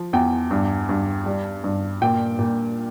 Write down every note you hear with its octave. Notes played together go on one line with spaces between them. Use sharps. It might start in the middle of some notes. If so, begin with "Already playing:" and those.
Already playing: F3
E2 G5
G2
G2
G3
G2
A#2 G5
A#2